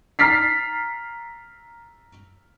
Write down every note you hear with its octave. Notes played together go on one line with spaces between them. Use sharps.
A#5 F6 A6 B6 C7